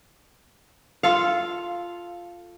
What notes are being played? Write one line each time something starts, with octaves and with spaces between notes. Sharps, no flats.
F4 A4 F5